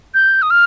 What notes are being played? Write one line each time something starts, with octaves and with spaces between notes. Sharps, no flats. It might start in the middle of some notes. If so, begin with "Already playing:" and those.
G6
D#6
F6